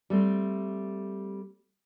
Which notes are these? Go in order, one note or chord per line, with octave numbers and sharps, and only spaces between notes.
G3 A3 C4